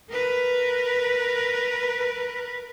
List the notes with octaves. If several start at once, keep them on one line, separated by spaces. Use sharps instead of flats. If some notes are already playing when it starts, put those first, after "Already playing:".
A#4 B4